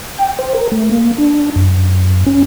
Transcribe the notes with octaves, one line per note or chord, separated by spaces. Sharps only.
G5
C5
A#4
A3
A#3
D4
F#2
C#4